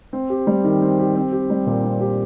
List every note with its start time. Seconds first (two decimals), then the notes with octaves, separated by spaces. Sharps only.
0.13 C4
0.30 G4
0.47 G3
0.65 D#3
0.82 C4
0.99 G4
1.16 C4
1.32 G4
1.50 G3
1.66 A#2
1.84 C4
2.00 G4